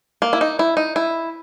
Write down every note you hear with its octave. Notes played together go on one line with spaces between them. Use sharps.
A#3
E4
D#4
E4
D#4
E4